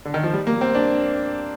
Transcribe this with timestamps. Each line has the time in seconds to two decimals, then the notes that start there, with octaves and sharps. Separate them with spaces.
0.05 D3
0.14 D#3
0.23 F3
0.33 G3
0.47 A#3
0.61 C4
0.75 D4